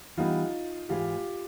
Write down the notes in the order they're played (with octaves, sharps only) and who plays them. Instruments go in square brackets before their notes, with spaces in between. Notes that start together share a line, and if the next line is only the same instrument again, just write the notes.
[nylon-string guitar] E3 G3 B3 D4 [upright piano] D#4 F4
[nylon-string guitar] G#2 E3 G#3 [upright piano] F4 G4